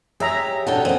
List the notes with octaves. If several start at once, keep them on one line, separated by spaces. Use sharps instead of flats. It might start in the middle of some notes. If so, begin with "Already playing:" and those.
G4 G#4 C#5 E5 A#5
B2 C#4 D4 A4 F#5 G5 A5
A#3 C4 D4 D#5 G#5